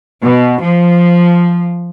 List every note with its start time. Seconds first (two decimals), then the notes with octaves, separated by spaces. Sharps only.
0.22 B2
0.62 F3